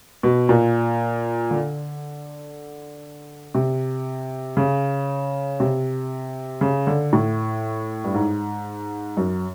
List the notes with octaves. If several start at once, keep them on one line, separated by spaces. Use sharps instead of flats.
B2
A#2
D3
C3
C#3
C3
C#3
D3
A2
G2
G#2
F#2